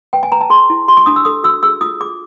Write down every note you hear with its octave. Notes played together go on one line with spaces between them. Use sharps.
B4 G5
G#5
B4 A#5
A5
G#4 C6
E4
G4 C6
C#6
D4 D#6
E6
A4 D#6
F#4 E6
G#4 E6
F4 D#6
G#4 D6